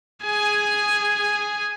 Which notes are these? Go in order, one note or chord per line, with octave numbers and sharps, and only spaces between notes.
G#4 G#5